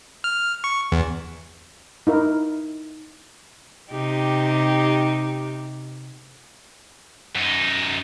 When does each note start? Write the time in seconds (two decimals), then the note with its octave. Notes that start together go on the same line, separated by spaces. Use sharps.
0.24 F6
0.64 C#6
0.92 E2
2.07 D#4 E4 A#4
3.91 C3 D#4 G4
7.35 F#2 D#4